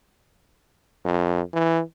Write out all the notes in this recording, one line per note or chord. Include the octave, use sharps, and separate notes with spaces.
F2
E3